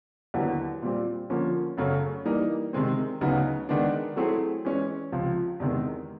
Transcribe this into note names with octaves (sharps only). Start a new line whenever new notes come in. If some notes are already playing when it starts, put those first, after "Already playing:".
D#2 D3 F#3 B3 E4
A#2 G3 C4
D3 F3 A#3 C#4
F#2 C#3 F#3 A3 C#4
E3 G3 A#3 D#4
C3 D#3 G#3 C4
D2 C#3 F#3 B3 D#4
D#3 G#3 B3 D4
F#3 A3 C4 E4 G#4
E3 G#3 C#4 E4
C#2 C3 F3
E2 C3 D#3 G#3